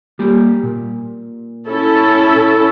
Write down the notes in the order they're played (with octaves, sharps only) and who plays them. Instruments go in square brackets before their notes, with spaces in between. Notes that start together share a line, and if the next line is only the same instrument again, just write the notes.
[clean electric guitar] G3 A#3 G4
A#2
[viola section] C#4 E4 A4